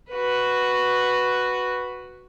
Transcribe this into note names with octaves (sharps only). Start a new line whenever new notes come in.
F#4 B4